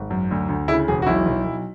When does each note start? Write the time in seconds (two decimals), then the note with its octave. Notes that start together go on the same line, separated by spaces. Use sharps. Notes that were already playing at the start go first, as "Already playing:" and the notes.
Already playing: G#1
0.10 F#2
0.31 D2
0.49 D2
0.68 C#3 E4
0.88 E1 G#4
1.02 F#4
1.06 B1 E4
1.26 B1
1.45 B1